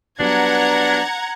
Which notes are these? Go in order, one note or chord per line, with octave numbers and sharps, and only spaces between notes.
F#3 G3 B3 D4 F#5 A#5 G#6